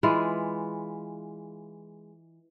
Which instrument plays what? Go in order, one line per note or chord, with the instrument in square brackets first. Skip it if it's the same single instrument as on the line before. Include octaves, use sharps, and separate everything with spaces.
[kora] E3 G#3 F4